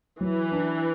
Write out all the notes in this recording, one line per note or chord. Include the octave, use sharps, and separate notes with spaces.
E3 F#3
D4